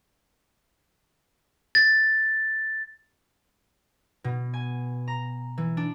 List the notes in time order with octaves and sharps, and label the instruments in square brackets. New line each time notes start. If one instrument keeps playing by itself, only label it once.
[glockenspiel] A6
[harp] B2
G#5
A#5
E3
D4